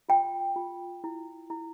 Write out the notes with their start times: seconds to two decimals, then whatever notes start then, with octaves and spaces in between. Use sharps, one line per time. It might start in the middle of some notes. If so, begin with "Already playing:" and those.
0.09 F4 G5
0.56 F4
1.04 E4
1.50 E4